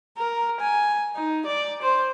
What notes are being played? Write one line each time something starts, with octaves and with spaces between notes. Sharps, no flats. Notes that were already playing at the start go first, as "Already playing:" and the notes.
A#4
G#5
D#4
D5
C5